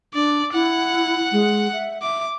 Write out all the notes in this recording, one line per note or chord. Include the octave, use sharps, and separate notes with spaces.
D4 D5
E4 F#5
G#3
E5
E5 D6